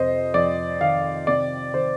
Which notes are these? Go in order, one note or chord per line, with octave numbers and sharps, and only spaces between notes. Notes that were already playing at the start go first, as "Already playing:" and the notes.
Already playing: F2 C3 C5 D#5
F2 D5
D#3 F5
C3 D5
D#3 C5